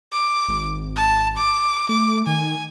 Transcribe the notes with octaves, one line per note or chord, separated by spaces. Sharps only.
D6
G#1
A5
D6
A3 D6
D#3 G#5